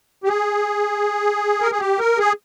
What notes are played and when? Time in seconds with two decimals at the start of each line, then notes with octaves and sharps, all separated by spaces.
0.24 G4
0.28 G#4
1.62 A#4
1.71 G#4
1.80 G4
1.99 A#4
2.18 G#4